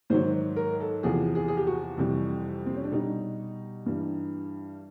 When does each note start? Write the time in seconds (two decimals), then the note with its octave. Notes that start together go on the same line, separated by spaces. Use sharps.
0.10 G#2 D#3 F#3 C5
0.56 A#4
0.80 A4
1.03 E2 C3 F3 G#4
1.35 G#4
1.48 G#4
1.57 G4
1.67 F#4
1.97 F2 C3 E3 G3
2.66 C4
2.75 C#4
2.84 D4
2.92 B2 G3 D#4
3.86 G2 E3 G3